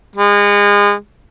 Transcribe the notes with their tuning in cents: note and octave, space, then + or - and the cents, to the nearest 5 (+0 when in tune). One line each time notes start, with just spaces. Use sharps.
G#3 -30